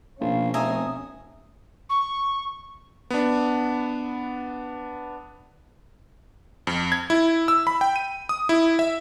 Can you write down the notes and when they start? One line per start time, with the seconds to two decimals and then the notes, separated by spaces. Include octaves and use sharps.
0.21 A#1 B2 C#4 F5
0.54 F1 E5 G#5 A#5 D#6
1.90 C#6
3.10 B3 D4
6.67 F2
6.92 G#6
7.10 E4
7.48 E6
7.67 B5
7.81 G5
7.96 D#7
8.29 D#6
8.49 E4
8.79 E5